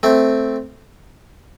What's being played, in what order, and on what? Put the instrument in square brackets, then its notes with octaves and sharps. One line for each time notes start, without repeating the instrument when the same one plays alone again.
[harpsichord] A3 C4